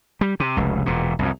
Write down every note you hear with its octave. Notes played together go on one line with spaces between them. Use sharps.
G3
C3
F1 C#2
E1 A#2
C2 F2